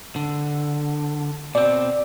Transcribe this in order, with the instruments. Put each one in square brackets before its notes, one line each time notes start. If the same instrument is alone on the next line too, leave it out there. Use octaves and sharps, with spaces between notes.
[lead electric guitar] D3
[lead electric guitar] B2 C4 [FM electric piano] D5